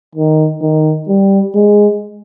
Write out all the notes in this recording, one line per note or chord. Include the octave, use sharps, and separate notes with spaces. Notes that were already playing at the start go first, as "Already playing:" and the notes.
D#3
D#3
G3
G#3